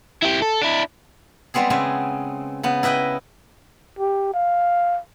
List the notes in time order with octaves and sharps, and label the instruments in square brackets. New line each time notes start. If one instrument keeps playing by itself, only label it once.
[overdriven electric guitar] E4 G4
A4
D4 E4
[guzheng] G3 G#3 B3 C4 G#4
C#3 B3 C4 E5 G#5
C#3 B3
E4 B4 D#5 G5 B5
[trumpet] G4
F5